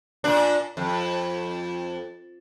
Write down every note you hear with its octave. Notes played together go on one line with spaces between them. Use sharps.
A#2 D4
F2